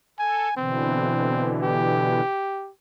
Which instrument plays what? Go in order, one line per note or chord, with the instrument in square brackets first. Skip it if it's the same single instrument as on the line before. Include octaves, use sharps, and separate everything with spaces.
[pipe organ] A4 [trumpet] G#5
[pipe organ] B2 D3 E3 [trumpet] C4
[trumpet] G4